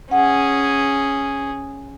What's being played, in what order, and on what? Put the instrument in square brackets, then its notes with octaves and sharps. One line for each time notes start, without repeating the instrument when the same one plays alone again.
[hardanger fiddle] C#4 G#4 [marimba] F#5